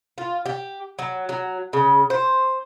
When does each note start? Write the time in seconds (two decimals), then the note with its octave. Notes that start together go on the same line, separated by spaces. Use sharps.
0.18 F4
0.46 G4
0.99 F#3
1.29 F#3
1.73 C#3
2.10 C5